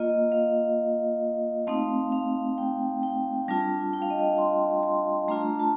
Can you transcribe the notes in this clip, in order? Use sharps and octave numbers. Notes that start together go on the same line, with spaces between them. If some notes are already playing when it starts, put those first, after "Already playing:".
Already playing: A#3 F4 D#5
F5
A3 C4 D#4 F5
F5
G5
G5
G3 D4 F4 A5
G5
F5
D#5
F5
C6
C6
A3 D4 F4 A#5
A5